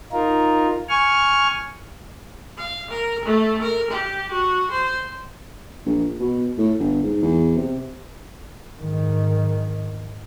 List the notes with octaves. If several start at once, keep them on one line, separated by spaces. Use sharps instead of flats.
D#4 F4 A#4
G#5 C#6 F6
F5
A#4
A3
A#4
G4
F#4
C5
A#1
B2
A2
G1
G#2
E2
C3
G#2 D#3